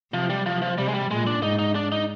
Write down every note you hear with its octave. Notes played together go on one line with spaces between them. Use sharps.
C3 F3
G3
F3
F3
C3 G3
G#3
G3
A#2 G#3
D4
G#2 D#4
D#4
D4
D#4